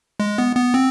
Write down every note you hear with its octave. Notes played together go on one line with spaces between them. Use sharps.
G#3
B3
B3
C4